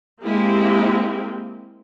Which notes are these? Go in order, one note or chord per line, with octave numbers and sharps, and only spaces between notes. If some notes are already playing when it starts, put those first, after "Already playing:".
G#3 A#3 C4 E4 G4